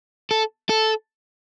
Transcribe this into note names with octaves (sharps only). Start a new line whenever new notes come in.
A4
A4